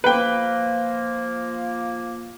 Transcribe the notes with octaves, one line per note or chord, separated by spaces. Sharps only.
F3 A#3 B4 G5